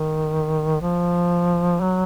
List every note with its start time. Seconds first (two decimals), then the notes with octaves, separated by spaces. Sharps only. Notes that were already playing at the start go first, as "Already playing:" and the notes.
Already playing: D#3
0.81 F3
1.81 F#3